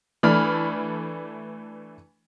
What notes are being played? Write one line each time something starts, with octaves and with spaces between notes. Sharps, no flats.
E3 A3 D4 B5 F6